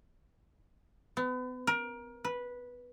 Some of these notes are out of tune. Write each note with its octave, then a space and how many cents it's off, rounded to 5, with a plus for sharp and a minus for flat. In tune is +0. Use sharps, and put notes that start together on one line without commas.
B3 +35
A#4 +25
B4 -10